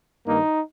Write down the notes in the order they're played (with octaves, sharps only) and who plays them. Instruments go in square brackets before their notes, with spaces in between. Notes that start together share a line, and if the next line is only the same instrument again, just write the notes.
[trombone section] G2 D#3 A#3 D#4